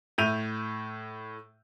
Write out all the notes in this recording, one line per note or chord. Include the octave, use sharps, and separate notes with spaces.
A2 E5 G6 D#7 F7